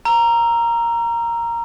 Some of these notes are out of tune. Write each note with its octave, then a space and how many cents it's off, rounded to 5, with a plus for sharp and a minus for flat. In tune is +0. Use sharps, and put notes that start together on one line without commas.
A#5 +0 E6 +40